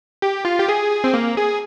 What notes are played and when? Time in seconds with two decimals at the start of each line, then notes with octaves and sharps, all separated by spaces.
0.22 G4
0.45 F4
0.59 G4
0.69 G#4
1.04 C4
1.14 A#3
1.37 G#4